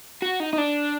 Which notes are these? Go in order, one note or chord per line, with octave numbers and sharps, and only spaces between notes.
F#4
D#4
D#4
D4